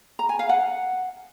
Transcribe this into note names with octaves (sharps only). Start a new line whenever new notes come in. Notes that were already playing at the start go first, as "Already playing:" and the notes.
A#5
G#5
F5
F#5